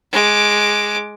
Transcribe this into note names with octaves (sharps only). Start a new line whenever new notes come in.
G#3 D6